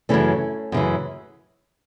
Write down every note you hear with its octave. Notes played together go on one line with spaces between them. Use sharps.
F#2 C#3 E3 A3 C#4
F#2 C#3 E3